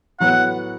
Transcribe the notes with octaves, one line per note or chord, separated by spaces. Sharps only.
A2 F#3 B3 F#4 B4 F#5